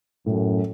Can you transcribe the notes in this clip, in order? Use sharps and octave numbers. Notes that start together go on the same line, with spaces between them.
F#2 A2